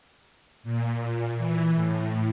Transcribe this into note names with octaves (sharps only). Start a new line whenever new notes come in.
A#2
E3
A2